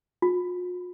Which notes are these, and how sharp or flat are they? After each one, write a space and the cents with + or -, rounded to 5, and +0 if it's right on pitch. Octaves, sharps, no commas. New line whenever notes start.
F4 +45